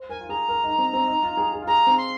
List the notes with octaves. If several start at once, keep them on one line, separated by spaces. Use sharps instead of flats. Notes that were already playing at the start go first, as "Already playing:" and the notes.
Already playing: C5
A#4 G#5
F4
G#4 A#5
A#4
D#4
C4
C4
D#4
F4
G#4
G#4
F4
G#4 A#5
C4
C6